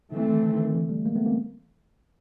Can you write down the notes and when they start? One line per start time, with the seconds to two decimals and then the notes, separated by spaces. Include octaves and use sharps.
0.12 D3 E3 A3 C4
0.28 D#3
0.43 D3
0.54 D#3
0.64 D#3
0.74 D3 E3
0.89 G3 A3
1.05 G#3 A#3
1.16 A3 B3
1.26 A#3 C4